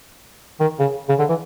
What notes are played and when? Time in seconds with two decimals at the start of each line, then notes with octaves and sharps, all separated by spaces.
0.60 D#3
0.80 C#3
1.09 C#3
1.19 D3
1.29 E3